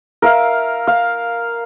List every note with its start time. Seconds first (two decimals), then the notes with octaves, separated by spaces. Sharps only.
0.22 A#4 E5 F5
0.87 F5